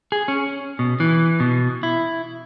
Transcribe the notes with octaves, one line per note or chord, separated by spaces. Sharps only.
G#4
C#4
B2
E3
B2
E4